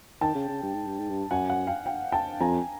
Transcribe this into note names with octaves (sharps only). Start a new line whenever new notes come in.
D#3 G5 A5
C#3
C#3
G2
G#2
G2
G#2
G2
F#2 F#5 G#5
F#5 G#5
F5 G5
F5 G5
G5 A5
F2 G#5 A#5